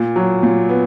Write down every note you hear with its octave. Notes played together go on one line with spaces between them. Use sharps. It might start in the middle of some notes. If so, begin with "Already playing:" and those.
Already playing: A#2
F#3
A#2
B3